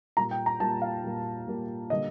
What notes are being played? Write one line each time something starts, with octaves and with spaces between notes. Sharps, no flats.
A#2 G3 A#3 A#5
G5
A#5
A#2 G3 A#3 A5
F5
A#2 G3 A#3
A#2 G3 A#3
D3 G3 A#3 D#5